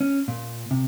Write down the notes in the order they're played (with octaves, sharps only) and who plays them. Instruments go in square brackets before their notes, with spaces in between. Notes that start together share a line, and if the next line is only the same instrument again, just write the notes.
[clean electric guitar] C#4
A#2
C3